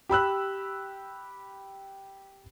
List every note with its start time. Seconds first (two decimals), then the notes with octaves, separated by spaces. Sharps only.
0.09 G4 B5 E6 F#6